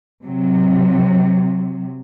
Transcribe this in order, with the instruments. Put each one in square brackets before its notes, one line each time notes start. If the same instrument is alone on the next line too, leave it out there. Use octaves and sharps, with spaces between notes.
[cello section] C3 F#3